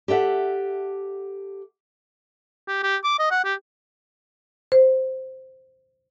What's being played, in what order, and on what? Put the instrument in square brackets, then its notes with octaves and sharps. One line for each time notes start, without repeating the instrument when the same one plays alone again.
[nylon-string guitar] G4 A4 E5 F#5
[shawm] G4
G4
D6
D#5
F#5
G4
[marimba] C5